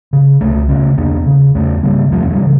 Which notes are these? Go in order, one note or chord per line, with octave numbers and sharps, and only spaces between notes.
C#3
C#2 A3 C#4
C#3 A3 C#4
E2 A#3 D4
C#3
E2 A3 C#4
C#3 G3 A#3
E2 F3 A3
E3 G3
C#3